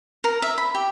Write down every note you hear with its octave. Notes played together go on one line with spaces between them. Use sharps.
A#4
E5
B5
G4